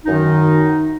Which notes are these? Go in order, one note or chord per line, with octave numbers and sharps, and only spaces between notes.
F#2 D#3 D#4